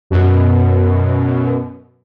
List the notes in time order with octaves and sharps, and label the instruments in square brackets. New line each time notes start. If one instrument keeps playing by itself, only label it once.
[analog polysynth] F#2 B2